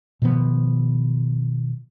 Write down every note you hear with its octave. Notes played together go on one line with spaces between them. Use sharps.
B2 D#3 F3 B3